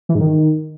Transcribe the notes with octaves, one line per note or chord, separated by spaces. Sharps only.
E3
G#2
D#3